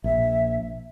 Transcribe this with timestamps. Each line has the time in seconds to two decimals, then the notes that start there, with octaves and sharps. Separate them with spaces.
0.04 A#1 E5